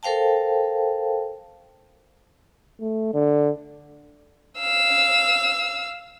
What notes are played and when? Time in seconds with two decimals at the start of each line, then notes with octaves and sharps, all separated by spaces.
0.03 A4 A#4 C5 F5 G5 A5
2.80 A3
3.14 D3
4.59 F5 E6